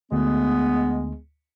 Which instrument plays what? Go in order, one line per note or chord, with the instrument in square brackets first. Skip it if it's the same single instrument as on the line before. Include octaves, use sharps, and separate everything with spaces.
[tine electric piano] D2 [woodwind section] G#3 B3